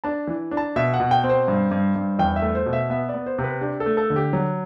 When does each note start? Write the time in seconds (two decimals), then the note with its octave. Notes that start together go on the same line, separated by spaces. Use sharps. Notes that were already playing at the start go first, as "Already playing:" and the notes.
0.04 D4 A5
0.27 E3
0.51 D4
0.57 A5
0.76 B2 E5
0.94 F#5
1.00 B2
1.11 G5
1.24 C4
1.29 C5
1.48 G2
1.71 G2
1.96 G2
2.19 E2 G5
2.36 E5
2.42 A3
2.55 C5
2.66 B2
2.73 E5
2.90 B3 E5
3.09 D5
3.14 B3
3.26 C5
3.38 C3
3.44 B4
3.61 D4 G4
3.80 A4
3.86 A3
3.97 A4
4.10 D3
4.16 G4
4.33 F#3